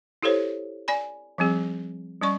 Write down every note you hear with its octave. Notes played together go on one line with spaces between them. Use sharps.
E4 G4 A4 C5 C#5
D5 G#5 B5
F3 G3 C4 G#4
G3 C#4 D5 C#6